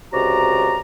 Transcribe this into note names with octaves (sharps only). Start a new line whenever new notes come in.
C#2 C3 F#4 D5 A#5